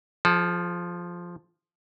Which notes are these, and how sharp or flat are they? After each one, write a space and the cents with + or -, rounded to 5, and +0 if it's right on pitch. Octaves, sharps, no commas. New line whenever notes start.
F3 +0 A4 -45